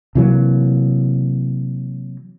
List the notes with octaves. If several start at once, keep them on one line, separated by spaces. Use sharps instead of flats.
C3 E3 F#3 A#3